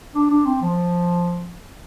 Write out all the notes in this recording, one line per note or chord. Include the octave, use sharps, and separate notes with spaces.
D4
D4
C4
F3